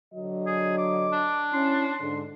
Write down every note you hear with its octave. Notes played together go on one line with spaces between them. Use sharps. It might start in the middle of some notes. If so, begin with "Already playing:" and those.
D3 F#3 D#5
G#4
D6
D4
C#4 E4 C6
G#2 D3